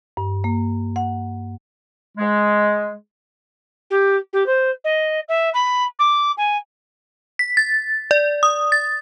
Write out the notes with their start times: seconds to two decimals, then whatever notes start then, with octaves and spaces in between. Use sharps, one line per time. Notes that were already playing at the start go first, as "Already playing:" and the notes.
0.17 G2
0.44 A#3
0.96 F#5
2.18 G#3
3.90 G4
4.33 G4
4.46 C5
4.84 D#5
5.28 E5
5.53 B5
5.99 D6
6.37 G#5
7.39 B6
7.57 A6
8.11 D5
8.43 D#6
8.72 A6